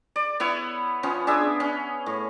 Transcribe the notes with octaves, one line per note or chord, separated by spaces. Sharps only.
D5
B3 E4 C#5
F3 B3 C#4
D4 G#4 E5 G#5
C#4
A2